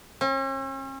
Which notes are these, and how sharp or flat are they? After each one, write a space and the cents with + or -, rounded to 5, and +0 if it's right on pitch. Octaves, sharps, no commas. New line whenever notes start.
C#4 -45